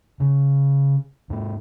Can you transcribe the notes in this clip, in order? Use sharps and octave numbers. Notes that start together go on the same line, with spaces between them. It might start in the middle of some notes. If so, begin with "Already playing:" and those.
C#3
G#2 A#3